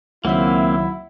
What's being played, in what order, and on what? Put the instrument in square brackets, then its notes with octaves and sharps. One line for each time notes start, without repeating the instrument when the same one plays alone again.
[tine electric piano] C#2 D#3 F#3 [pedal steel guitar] A#3 C4 [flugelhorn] E4 [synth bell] E5 F#5